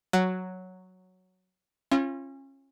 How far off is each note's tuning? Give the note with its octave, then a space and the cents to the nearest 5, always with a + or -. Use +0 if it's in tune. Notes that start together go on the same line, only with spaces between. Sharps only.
F#3 +0 F#4 +0
C#4 -30 F4 -25